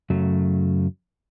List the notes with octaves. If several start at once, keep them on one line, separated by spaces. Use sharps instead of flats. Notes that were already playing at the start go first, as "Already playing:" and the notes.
F#2 C#3 F#3 A3